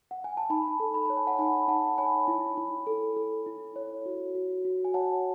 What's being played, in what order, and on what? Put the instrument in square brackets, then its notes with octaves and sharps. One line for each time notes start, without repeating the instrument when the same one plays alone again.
[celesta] F#5
G#5
A5
D#4 G#5 B5
A4
B5
C#5 A5
G#5
F#5 A5
D#4 G#5 B5
D#4 F#5 A5
C#5 G#5 B5
E4
E4
A4
A4
E4
C#5
F#4
F#4
F#4
G#5
C#5 F#5 A5